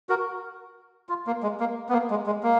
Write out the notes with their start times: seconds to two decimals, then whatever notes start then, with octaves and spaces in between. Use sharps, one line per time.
0.09 F#4 A#4
1.09 F4
1.27 A#3
1.43 G#3
1.60 A#3
1.89 B3
1.93 A#3
2.10 G#3
2.26 G#3
2.43 A#3